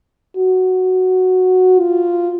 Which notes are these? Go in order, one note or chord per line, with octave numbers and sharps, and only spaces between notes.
F#4
F4